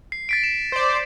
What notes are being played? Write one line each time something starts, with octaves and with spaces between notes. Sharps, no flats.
C7
A6 B6 D7
E7
C5 D5